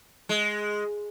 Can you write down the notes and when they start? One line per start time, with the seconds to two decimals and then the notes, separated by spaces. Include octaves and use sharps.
0.29 G#3